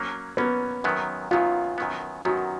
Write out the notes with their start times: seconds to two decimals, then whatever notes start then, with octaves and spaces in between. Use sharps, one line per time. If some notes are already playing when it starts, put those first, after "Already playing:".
Already playing: F#3 A#3 C#4
0.37 F#3 A#3 B3 C#4
0.84 F#2 D#3 F#3 B3
1.31 F#2 D#3 F#3 B3 F4
1.78 F#2 D#3 F#3 B3
2.25 F#2 D#3 F#3 B3 F#4